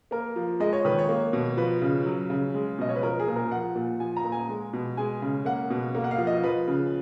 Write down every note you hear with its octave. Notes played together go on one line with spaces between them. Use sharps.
A#3 A#4
F3
G#3 D#5
C#5
D#3 B4
C#5
A#3
B2
F3 B4
C#3
F#3
C#3
G#3
B2 D#5
C#5
B4
F3 A#4
G#4
A#2
A#4
F3 F#5
A#2
F3 G#5
A#5
A#2
G#5
G#3
B2
G#3 G#5
C#3
A#3 F#5
B2
A#3
F#5
F5
F3
D#5
F3 B4
C#3